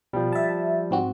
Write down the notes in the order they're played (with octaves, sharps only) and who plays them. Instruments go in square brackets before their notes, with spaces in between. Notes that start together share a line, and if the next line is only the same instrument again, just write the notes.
[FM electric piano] B2 [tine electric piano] F3 G3
[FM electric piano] E5 A5
G#2 C4 F#4